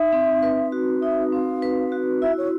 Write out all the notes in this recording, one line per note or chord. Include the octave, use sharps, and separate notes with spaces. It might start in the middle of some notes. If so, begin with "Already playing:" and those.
Already playing: D#4 E5
C4
B4
F#4
D#4 E5
C4 F5
B4
F#4
E4 E5
C#5